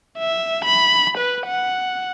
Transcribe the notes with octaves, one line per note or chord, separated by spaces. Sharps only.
E5
B5
B4
F#5